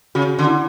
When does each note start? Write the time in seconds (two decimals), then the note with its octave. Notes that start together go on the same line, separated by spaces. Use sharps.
0.15 C#3 F#4
0.39 D3
0.47 E4